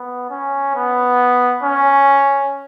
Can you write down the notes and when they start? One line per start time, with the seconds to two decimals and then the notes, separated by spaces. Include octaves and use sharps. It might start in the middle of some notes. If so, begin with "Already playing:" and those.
Already playing: B3
0.30 C#4
0.75 B3
1.63 C#4